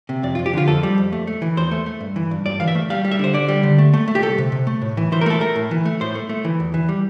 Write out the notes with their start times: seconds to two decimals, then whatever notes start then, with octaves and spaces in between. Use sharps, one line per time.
0.09 C3
0.23 F2 D5
0.35 F4
0.39 F2
0.46 G4
0.53 D3 F4
0.68 F2 A4
0.83 G3
0.98 F2
1.12 A3
1.27 A3
1.42 E3
1.57 E2 C5
1.71 A3
1.86 A3
2.01 G2
2.16 E3
2.31 G2
2.46 G2 D5
2.60 E3 F5
2.68 E5
2.75 A3
2.90 G3 F5
3.05 G3
3.11 E5
3.19 D3 C5
3.34 D3 D5
3.48 G3
3.63 D3
3.78 A3
3.93 A3
4.08 A3
4.15 G4
4.22 C2 A4
4.38 C3
4.52 C3
4.67 A3
4.82 A2
4.97 E3
5.12 E3 C5
5.21 A#4
5.26 A3 A4
5.41 A3 A#4
5.56 A2
5.71 E3
5.85 A3
6.01 A2 C5
6.15 A3
6.29 A3
6.45 E3
6.60 E2
6.74 E3
6.89 G3